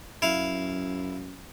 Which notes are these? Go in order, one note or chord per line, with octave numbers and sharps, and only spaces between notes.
F#2 E4 F5